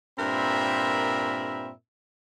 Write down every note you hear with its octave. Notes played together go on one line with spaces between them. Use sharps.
G2 A#2 C4 A#4 E5 B5